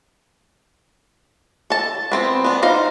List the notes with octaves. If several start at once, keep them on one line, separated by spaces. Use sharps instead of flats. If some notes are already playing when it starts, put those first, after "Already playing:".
A4 A5
B3 C4 C5
B3 D4
D#4 C5 F5